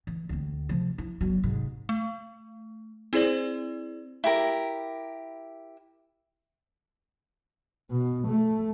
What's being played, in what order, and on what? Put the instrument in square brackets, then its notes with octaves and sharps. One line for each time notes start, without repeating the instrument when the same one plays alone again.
[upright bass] E3
D2 C4
C3 F3
E4
G1 F#3
G#2 C3
[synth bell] A3
C4 E4 G#4 C5 D5
[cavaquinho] E4 G4 A#4
[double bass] B2
A3